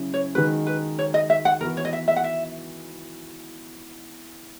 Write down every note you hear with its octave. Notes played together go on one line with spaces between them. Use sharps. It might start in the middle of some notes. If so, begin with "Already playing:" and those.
Already playing: C#3 F#3 C#4 E4
C#5
D#3 G#3 D#4 F#4 B4
B4
C#5
D#5
E5
F#5
E3 B3 F#4 A#4
C#5
D#5
E5
E5
F#5
E5